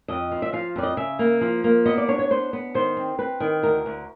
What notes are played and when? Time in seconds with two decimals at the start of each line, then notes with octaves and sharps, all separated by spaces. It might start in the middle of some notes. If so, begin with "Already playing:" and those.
0.08 F2 D#5
0.31 F3
0.42 E5
0.53 F3 F5
0.76 F2 D5
0.83 D#5
0.97 C#3 E5
1.19 A#3
1.41 F3
1.64 A#3
1.86 B3 D#5
1.98 D5
2.08 D4 C#5
2.19 C#5
2.30 B3 C5
2.53 B3
2.74 D#3 C5
2.97 C4
3.19 C4 B4
3.40 D#3
3.63 D2 A#4
3.86 D2